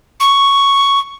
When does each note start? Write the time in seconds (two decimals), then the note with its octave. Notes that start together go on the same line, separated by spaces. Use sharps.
0.20 C#6